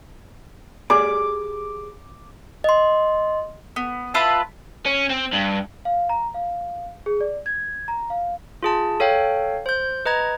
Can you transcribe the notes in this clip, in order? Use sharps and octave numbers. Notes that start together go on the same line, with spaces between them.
G4 G#4 D5 D6
D#5 C6
B3
E4 F4 B4 A5
C#4
C4
G2
F5
A#5
F5
G#4
D5
G#6
A#5
F5
F4 G#4 A5
A4 C#5 F5 G5
C5 G6
B4 D#5 A#5 G#6